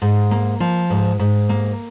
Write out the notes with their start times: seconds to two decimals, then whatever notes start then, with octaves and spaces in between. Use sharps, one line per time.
0.02 G#2
0.31 A#3
0.60 F3
0.90 G#2
1.19 G#2
1.49 A#3